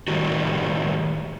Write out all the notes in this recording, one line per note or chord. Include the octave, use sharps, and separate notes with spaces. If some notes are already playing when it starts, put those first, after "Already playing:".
A2 D#3 G3 F#4